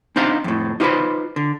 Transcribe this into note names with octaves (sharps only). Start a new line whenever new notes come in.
C4 D4 D#4 C5 F5 F#5
F2 A2
D#4 F4 G4 B4 C5 B5
D3